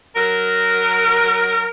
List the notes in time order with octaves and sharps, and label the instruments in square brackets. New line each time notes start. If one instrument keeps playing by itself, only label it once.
[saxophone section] F#3 A#4